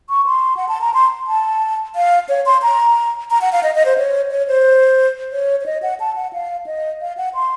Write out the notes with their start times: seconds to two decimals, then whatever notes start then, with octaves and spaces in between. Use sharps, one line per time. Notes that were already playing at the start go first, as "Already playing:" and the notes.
0.10 C#6
0.26 C6
0.57 F#5
0.68 A5
0.81 A#5
0.94 C6
1.27 A5
1.96 F5
2.29 C#5
2.46 C6
2.62 A#5
3.30 A#5
3.41 F#5
3.52 F5
3.63 D#5
3.75 D#5
3.86 C5
3.98 C#5
4.31 C#5
4.48 C5
5.32 C#5
5.61 C#5
5.66 D#5
5.82 F#5
6.00 A5
6.16 F#5
6.33 F5
6.67 D#5
7.01 F5
7.17 F#5
7.34 C6